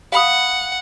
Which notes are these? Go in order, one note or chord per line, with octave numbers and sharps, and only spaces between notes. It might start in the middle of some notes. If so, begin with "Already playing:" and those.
F5 F#5 B5 D#6